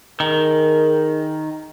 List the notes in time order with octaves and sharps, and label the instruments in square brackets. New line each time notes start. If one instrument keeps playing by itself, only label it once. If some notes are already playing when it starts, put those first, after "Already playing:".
[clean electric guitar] D#3 [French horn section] G#4 A#4